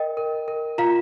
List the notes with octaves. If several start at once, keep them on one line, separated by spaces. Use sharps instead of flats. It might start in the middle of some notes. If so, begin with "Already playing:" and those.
Already playing: A#4 D#5 G5
A#4
A#4
F4 F5 A#5